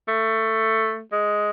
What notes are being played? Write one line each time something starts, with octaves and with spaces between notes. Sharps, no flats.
A3
G#3